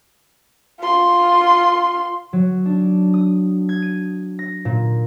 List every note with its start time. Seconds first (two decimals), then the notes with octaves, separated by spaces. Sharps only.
0.80 F4 C6
2.33 F#3
2.66 D4
3.14 D#6
3.69 G#6
3.82 D#7
4.39 A#6
4.65 A#2